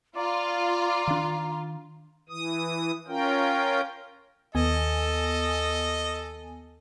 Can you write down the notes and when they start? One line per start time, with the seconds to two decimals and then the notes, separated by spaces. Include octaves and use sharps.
0.16 F4 D5 A#5
1.08 D#3 D4
2.29 E3 D#6
3.08 C#4 F4 A#4 G5
4.55 D#2 B3 A4 D#5 G#5